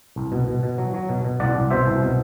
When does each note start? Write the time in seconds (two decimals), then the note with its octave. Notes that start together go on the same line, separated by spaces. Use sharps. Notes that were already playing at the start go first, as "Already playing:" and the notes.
0.16 C2
0.32 B2
0.48 B2
0.63 B2
0.78 F#3
0.94 F#3
1.09 B2
1.25 B2
1.40 C2 D5 F#5
1.55 C2
1.71 B2 C5 E5
1.87 C2
2.02 B2